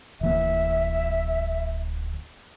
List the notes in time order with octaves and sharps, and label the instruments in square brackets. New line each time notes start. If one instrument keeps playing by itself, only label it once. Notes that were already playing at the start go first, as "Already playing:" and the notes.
[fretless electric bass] D1 E3 A#3 [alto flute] E5